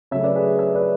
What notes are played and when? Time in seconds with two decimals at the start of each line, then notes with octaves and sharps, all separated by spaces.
0.11 C#3 F#3 A3 C#5 E5
0.23 B4 D5
0.36 G#4 B4
0.58 C#5 E5
0.74 B4 D5